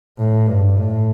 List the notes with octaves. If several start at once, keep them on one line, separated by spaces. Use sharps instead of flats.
A2
G2
A2